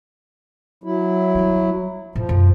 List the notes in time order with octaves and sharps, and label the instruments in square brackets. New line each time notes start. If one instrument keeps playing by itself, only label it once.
[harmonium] F#3 E4
[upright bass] G3 D4
[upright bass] A2 [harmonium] F3
[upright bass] F#2 G#3